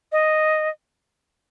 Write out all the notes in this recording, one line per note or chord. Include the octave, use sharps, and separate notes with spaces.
D#5